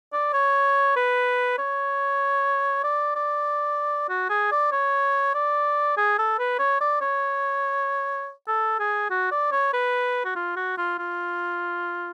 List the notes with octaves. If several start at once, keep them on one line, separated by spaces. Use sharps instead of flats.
D5
C#5
B4
C#5
D5
D5
F#4
G#4
D5
C#5
D5
G#4
A4
B4
C#5
D5
C#5
A4
G#4
F#4
D5
C#5
B4
F#4
F4
F#4
F4
F4